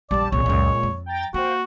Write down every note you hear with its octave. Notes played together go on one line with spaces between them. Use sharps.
A#1 E2 G3 D5 A5
C2 A#2 E3 G#3 C#5
C#2 F#2
F2
G5 A#5 A6
A#3 F#4 C5 F5 G5